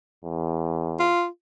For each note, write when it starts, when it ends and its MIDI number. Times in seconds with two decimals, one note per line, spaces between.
0.25 1.10 40
0.99 1.26 65